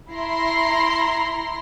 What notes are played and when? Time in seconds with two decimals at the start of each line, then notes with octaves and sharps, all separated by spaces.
0.13 E4 A#5 C6